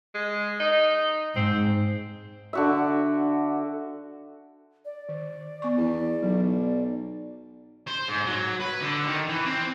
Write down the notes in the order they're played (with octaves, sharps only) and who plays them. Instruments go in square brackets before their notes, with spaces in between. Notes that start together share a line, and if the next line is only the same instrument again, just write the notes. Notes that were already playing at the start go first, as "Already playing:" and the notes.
[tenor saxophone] G#3
D#4
[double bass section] G#2 [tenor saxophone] C4
[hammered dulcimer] D3 F#4 E5
[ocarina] D5
[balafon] D#3
B3 C#6
[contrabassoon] E2
[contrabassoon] B1 [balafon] F#3
[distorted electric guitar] C5
G#2
F#3
B4
D3
D#3
E3
C4